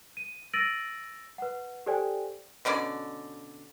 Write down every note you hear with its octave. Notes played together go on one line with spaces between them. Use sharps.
D#7
E6 A6 A#6 D7 D#7 F#7
B4 F#5
G4 A4 C5 D5 G5 G#5
B2 D3 C#4 D5